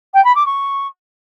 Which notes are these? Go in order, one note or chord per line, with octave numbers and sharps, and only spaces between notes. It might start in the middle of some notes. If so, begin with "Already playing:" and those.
G5
B5
D6
C#6